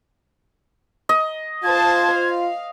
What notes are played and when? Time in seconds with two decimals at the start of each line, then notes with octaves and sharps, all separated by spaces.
1.09 D#5
1.64 F4 C5 A5 G#6
2.13 F5